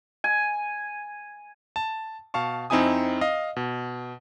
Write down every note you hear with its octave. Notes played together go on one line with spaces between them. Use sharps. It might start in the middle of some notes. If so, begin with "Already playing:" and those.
G#5
A5
B2 F5 A5 C#6
F2 C4 D#4 E4 G#5 D#6
D#5 F5
B2